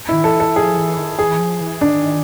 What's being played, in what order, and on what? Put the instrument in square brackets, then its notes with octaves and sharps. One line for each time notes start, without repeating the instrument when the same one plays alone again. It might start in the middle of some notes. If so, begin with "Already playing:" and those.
[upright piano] E4
[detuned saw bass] D#3
[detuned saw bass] E3 [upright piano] A4
[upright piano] A4
[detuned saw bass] F3 [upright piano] G#4
[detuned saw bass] E3
D#3
[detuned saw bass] E3 [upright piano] G#4
[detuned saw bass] F3
E3
[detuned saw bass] D#3 [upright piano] D4